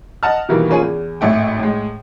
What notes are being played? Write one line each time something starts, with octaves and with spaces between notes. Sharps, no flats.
D#5 F#5 A5 F6
B2 D#3 E3 G3 A#3
A#3 C#4 F4 G#4
E2
G#1 A2 A3 G5
A2 G#3